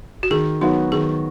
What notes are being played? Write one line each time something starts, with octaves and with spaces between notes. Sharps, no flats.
F#4
D#3 G#4
F#3 B3 D#4 F#4
D#3 G#4